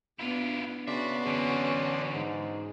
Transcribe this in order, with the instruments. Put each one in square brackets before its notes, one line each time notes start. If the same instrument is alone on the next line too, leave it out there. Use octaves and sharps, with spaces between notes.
[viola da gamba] B3 D4 [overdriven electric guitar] E4 F4
[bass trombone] C#3 [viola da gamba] B3 F#4 [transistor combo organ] D4 D5 C6 [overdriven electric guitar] E5
[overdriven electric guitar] D3 E3 [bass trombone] C#4
[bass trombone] G#2